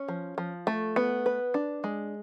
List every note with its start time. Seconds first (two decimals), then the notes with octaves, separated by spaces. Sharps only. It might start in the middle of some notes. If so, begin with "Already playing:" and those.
Already playing: C#4
0.08 F3
0.38 F3
0.67 A3
0.96 B3
1.26 B4
1.54 D4
1.84 G#3